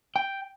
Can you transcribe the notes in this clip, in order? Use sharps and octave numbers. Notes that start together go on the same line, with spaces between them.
G5